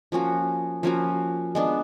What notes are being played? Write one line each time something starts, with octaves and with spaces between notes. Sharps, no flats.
F3 A#3 C#4 F#4
F3 A#3 C#4 F#4
G#3 B3 D4